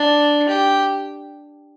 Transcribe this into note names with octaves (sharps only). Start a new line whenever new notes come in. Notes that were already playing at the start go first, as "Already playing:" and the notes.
Already playing: D4
G4